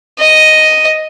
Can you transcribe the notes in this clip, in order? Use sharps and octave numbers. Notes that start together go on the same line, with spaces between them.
D#5